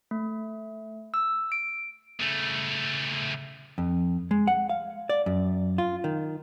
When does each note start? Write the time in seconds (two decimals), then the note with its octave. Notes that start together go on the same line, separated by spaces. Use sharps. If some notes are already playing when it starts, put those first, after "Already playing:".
0.11 A3
1.14 E6
1.52 D7
2.20 C#3 A3
3.78 F2
4.31 G#3
4.47 F#5
4.70 F5
5.09 D5
5.26 F#2
5.78 F4
6.04 D#3